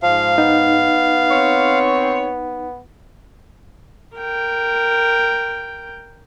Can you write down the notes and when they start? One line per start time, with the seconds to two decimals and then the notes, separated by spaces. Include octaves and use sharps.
0.03 G#2 F3 F5
0.38 B3 D#4
1.30 C4 C#5
4.17 A#4 G5